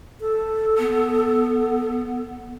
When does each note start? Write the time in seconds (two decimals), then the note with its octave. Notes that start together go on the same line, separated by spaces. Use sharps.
0.21 A4
0.78 B3